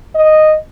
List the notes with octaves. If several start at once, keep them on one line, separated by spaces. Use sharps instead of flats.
D#5